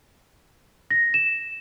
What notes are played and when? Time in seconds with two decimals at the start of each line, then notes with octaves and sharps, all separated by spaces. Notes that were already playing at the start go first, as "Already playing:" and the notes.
0.91 A#6
1.14 E7